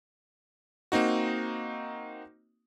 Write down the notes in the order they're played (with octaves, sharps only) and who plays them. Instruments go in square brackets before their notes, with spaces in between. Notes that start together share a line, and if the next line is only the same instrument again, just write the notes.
[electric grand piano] A#3 C4 D#4 F#4